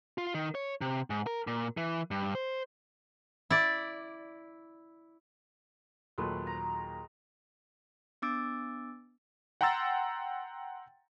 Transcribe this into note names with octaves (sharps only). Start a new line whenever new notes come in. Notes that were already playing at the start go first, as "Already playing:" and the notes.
F4
D#3
C#5
C3
G#2
A#4
A#2
E3
G2
C5
E4 D5
D#2 A#2 F#3 G#3 A3 B4
A#5
B3 D4 D6 E6 A6 D7
F#5 G5 A#5 C6 E6 A6